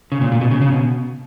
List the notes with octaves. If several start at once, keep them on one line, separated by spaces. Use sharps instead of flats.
C#3
A#2
A#2
B2
C#3
C#3
B2